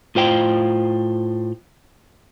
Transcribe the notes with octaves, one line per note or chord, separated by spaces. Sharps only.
A2 F4 C5 G5